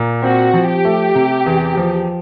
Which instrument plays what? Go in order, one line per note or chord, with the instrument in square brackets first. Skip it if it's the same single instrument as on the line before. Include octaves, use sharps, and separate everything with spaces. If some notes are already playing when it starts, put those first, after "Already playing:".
Already playing: [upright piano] A#2
[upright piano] C4 [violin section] F#4
[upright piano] F3
[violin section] G4
[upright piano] A3
C3
E2
F3